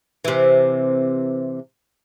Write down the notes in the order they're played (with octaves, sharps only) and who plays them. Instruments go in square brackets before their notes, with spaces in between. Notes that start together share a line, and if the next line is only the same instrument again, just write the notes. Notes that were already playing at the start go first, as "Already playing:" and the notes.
[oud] C3 E3